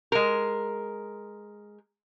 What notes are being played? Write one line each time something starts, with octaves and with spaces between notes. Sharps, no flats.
G#3 A#4